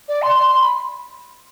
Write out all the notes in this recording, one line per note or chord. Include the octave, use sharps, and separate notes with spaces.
D5
C6
C6
C6
B5